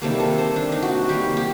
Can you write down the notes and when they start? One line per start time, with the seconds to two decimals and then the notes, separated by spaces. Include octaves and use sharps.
0.02 C3 D#3 G3 A#3 A4
0.20 A4
0.38 C5
0.56 D4
0.72 D#4
0.82 F#4
1.09 D#3 G3 A#3 G4
1.37 G4